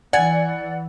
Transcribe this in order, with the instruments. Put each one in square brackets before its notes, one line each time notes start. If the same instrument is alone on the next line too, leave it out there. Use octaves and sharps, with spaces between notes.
[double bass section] E3 [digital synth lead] D5 [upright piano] F#5 [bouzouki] G#5